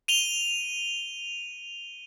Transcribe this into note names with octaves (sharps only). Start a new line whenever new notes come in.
D#7 F7 G7